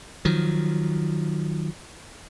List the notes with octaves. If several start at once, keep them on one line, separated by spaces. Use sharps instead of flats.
D#3 F3 F#3